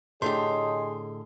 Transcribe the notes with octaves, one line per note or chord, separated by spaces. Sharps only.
A2 D3 G4 G#4 C#5 D#5 C6